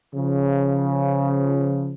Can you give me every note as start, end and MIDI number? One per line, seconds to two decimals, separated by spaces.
0.15 1.94 49
0.15 1.94 53